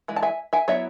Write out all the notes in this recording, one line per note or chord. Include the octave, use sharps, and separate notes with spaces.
E3 G#3
A5
E5 G#5
E5 G#5
F#3 B3 E4 C#5 E5